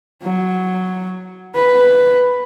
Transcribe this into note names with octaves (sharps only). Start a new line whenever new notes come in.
F#3
B4